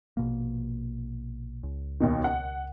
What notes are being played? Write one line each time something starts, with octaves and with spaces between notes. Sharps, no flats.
A#1 B2 A#3
C#2
D#2 B2 D#3
F#5